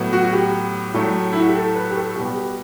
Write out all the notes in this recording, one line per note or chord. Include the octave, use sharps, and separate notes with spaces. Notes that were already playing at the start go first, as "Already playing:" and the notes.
Already playing: A2 F#3 B3
F#4
F#4
G4
A2 F#3 A3
E4
F#4
G4
A4
B4
G4
A4
B2 G3 B3 G4
G4